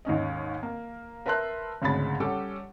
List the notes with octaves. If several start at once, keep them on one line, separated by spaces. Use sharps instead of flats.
D#2 G#2 C#4 D#5
A#3
A#4 B4 E5 A5 C6 F#6
G#1 D2 C#3 G#3 B5 A6
G3 C#4 G4 A4 F#5